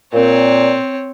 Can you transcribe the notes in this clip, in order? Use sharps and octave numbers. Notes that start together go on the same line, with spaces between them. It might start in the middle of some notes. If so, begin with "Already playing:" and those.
A#2 C4 C#5